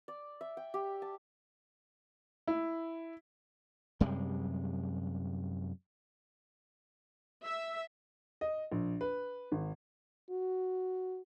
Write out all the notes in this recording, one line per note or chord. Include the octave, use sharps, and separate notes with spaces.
D5
E5
G5
G4
A5
E4
F#2 C3 G3 G#3
E5
D#5
A#1
B4
G#1
F#4